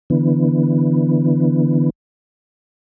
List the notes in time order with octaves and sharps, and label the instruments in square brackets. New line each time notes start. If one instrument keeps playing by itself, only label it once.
[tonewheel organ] D3 E3 B3